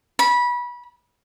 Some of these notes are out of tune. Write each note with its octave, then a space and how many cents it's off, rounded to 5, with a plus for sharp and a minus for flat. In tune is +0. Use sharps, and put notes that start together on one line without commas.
B5 -25